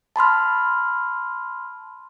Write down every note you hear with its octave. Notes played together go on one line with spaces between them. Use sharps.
A5 B5 C6 F6